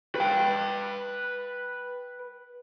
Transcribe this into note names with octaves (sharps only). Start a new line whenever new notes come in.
B4 G5